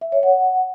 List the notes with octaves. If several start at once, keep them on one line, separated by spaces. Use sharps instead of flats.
E5
C#5
F#5